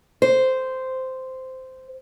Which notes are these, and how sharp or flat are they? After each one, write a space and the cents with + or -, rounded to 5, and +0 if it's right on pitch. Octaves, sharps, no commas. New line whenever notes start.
C5 -10